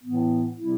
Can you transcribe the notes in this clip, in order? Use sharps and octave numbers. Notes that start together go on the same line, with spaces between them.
A2 E3 B3
C3 G3 C4 E4